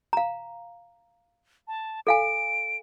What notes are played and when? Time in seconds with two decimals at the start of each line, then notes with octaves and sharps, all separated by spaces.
0.13 F5 A#5
1.68 A5
2.07 A4 F5 G#5 D7